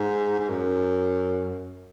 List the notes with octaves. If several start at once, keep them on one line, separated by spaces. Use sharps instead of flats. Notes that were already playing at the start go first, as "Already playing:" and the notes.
Already playing: G#2
G#2
F#2